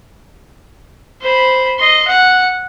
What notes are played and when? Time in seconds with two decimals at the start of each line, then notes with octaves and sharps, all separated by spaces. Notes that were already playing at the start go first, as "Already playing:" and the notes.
1.21 C5 B5
1.78 D#5 C6
2.07 F#5